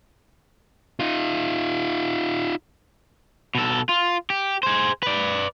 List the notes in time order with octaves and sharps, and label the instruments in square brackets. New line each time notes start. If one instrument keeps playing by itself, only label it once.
[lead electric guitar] D#4 F4
[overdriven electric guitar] B2 A4
F4
G4
G#4 C5
B4 D5